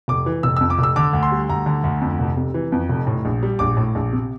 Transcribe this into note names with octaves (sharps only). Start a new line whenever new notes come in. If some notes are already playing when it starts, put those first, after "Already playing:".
F1 D6
E3
F1 E6
F2 E6
D6
F1 E6
D3 D6
D2
C6
G3
D2 A#5
D3
D2
F2
F1
C3
E3
F2
F1
A2
A#1
G3
A#1 D6
A2
A#1
C3